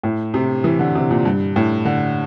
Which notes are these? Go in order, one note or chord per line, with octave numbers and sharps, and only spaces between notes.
A2
C3
E3
D3
C3
A#2
G2
A2
D3